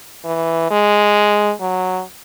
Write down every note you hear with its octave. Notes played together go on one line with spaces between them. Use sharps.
E3
G#3
F#3